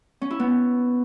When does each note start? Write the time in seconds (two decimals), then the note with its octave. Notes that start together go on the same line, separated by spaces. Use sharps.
0.21 C#4
0.30 E4
0.40 B3